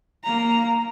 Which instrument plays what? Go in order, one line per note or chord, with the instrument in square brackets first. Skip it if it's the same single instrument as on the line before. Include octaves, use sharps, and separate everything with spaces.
[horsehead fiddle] A#3 A#5